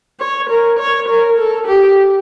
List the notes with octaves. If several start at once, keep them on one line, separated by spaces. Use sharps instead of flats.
C#5
A#4
C#5
A#4
A4
G4